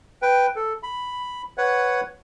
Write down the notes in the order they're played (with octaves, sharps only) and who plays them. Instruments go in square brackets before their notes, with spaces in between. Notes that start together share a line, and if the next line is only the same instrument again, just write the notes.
[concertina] B4 G5
A4
B5
B4 C#5 F#5